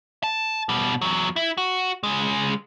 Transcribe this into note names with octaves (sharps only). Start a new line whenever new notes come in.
A5
B2 G3
E2 F#3
E4
F#4
C#3 G#3